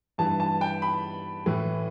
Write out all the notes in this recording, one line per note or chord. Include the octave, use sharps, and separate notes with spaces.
G2 E3 A5
A5
G5
B5
A2 E3